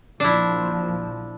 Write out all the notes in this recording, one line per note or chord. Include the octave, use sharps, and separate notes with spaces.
A#1 F3 D4 E4